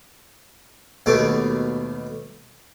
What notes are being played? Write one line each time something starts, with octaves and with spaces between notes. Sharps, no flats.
D#2 B2 A3 D#4 D6